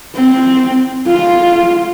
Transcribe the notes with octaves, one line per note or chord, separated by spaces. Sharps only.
C4
F4